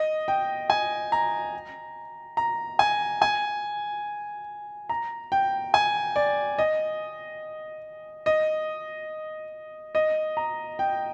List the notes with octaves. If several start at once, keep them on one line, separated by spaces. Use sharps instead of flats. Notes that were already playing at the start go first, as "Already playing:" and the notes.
Already playing: D#5
G5
G#5
A#5
A#5
G#5
G#5
A#5
G5
G#5
D5
D#5
D#5
D#5
A#5
G5